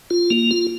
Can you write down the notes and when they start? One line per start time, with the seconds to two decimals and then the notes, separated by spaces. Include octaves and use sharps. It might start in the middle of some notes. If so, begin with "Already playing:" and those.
0.10 F4
0.31 A#3
0.51 F4